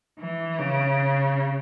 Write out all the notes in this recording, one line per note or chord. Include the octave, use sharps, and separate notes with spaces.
E3
C#3